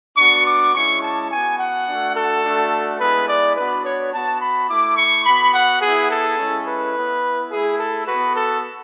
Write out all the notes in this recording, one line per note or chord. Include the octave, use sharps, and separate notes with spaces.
B3 D4 F#4 C#6
D6
G#3 C#4 E4 C#6
A5
B3 F#4 G#5
F#5
A3 D4 F#4
A4
A3 D4 F#4
G#3 B3 E4 B4
D5
B3 D4 F#4 B4
C#5
B3 F#4 A5
B5
A3 E4 D6
C#6
B3 F#4 B5
F#5
B3 E4 G#4
A4
G#3 C#4 E4
B4
B3 E4
A3 E4 G#4
A4
B3 F#4 B4
A4